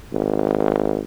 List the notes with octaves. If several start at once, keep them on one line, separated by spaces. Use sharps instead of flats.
G#1